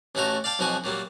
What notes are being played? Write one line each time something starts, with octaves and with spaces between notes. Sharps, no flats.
A1 A2 A3 E4 F#4 A#5
D5 F5 G5 A5 D6
B1 F2 F3 E4 F#4 G#5
A#2 F#3 G3 A#3